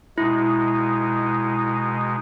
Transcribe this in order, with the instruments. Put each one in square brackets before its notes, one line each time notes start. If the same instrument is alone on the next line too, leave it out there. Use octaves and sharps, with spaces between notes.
[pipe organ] B2 G#3 D#4 [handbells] E4